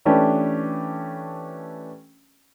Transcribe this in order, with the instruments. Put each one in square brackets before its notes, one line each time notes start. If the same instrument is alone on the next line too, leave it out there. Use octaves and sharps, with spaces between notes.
[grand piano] E3 A3 C#4 D4 G4 B4